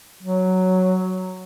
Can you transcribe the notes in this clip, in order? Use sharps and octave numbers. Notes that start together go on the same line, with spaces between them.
F#3